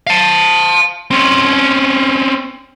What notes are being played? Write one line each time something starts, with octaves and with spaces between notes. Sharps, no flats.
F5 A5
C4 C#4